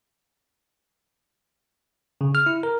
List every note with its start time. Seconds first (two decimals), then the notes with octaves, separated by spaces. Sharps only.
2.21 C#3
2.35 F6
2.46 E4
2.63 A#4